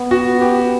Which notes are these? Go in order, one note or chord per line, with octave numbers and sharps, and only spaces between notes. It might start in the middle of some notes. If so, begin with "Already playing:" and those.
Already playing: B3
F#4
G4